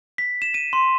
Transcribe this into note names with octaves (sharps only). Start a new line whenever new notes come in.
B6
E7
D#7
C6